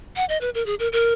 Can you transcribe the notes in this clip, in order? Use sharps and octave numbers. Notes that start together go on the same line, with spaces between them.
F#5
D#5
B4
A#4
G#4
A#4
A#4